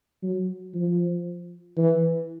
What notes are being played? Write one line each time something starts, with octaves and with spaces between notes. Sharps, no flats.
F#3
F3
E3